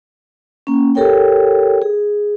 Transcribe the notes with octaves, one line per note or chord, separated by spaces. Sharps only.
A#3 C#4
G4 A4 A#4 C#5 G5
G#4